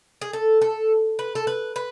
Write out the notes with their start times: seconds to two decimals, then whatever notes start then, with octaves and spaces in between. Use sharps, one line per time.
0.22 G#4
0.33 A4
0.61 A4
1.19 B4
1.35 A4
1.47 B4
1.76 B4